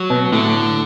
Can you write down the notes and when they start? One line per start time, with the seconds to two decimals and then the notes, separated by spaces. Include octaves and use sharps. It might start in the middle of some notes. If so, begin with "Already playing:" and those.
Already playing: F#3
0.10 B2
0.32 A2 D3